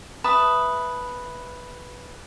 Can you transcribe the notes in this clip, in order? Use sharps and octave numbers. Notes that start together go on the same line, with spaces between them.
B4 E5 A5 D#6